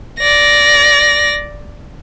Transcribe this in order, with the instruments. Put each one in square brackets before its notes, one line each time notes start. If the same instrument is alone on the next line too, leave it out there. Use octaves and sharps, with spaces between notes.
[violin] D5 A#6